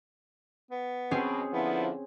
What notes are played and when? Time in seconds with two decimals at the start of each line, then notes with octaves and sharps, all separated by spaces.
0.71 B3
1.11 B2 C4 C#4 G#4
1.53 D3 F3 B3 E4